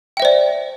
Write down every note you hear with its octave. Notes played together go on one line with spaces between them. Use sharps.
C5 D5 E5 G5